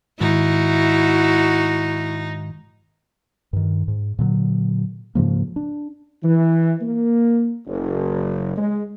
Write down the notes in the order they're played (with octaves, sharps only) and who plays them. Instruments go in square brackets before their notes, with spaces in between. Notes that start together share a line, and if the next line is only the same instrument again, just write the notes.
[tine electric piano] G#2 D#3 G#3 [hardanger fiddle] D#4 [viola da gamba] E4 [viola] F#4
[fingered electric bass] G2 D#3
G#2
A#2 D3 F#3
G#2 C#3 F3 A#3
D4
[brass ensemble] E3
A#3
F#1
G#3